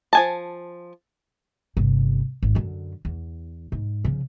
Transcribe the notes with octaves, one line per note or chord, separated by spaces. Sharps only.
F3 G#5 A5
G1 C3
G#1
F#2 D3
E2
G#2
C#3 F3